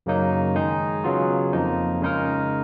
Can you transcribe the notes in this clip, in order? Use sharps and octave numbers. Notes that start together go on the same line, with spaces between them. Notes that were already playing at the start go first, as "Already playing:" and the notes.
F#2 C#3 F#3 A#3 D#4
D#3 G#3 D#4 G#4
C#3 F#3 B3 F4 G#4
F2 F3 A#3 D#4
C#3 G#3 D#4 A#4